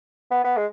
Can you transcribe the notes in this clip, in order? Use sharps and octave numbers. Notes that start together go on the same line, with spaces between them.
B3
B3
G#3